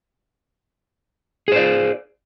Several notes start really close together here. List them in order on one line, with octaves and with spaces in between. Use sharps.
G#4 C5 D5